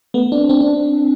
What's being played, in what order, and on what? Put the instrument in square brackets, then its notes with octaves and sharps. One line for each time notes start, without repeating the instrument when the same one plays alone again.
[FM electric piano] A3 B3
C4 D4
C4 D4
C4 D4